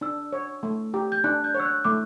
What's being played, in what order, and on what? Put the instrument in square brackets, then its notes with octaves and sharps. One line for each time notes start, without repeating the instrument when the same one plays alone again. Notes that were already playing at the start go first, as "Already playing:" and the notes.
[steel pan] D4 [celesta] E6
[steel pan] C#5
A3
G4
[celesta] G6
[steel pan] D4 [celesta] F#6
[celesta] G6
[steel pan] C#5
[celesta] E6
F#6
[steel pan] A3 [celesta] D6